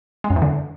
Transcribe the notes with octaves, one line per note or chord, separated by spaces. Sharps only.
G#3
F#2
E2
D3